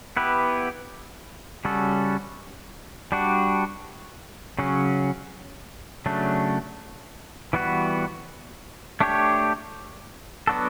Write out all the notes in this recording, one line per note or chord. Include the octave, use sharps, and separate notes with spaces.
B3 E4 G4 B4
C#3 G3 C#4 F#4 A4
G3 D4 F#4
C#3 F#3 C#4
C#3 F#3 A3 D4
E3 G3 B3 F#4 B4
A3 D4 G4 C#5
F#3 B3 D4 F#4 A4